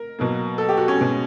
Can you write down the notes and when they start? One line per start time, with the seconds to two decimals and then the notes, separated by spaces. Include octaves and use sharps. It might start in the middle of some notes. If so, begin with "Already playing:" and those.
Already playing: A#4
0.19 B2 F#3 A#3
0.58 A4
0.69 G4
0.77 F#4
0.88 C#4
0.97 B2 G#3